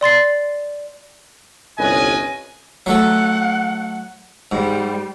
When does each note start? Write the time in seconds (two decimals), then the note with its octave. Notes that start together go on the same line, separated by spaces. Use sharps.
0.01 D5 C6 A6 C7
1.78 G1 C2 C#4 B4 D#5 G#5
2.86 F#3 A3 A4 F#5
4.51 G#2 G3